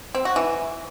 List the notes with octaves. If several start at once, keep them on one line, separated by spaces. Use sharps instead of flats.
C4
F#4
E3